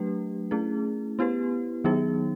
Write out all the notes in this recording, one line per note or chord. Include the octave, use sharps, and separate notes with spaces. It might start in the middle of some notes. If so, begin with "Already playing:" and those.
Already playing: F#3 A3 D4 G4 B4
A3 C#4 E4 G#4
B3 E4 G4 B4
D#3 F#3 B3 D#4 G#4